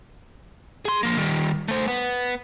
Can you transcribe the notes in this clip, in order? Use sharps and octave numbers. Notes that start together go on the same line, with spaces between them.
G#4 C6
F3 A#3
D#3 G3
A3 C5
B3